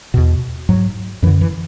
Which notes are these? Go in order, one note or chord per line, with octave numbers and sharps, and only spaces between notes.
E2 B2
G#2 F#3
F#2 D3 E3
E3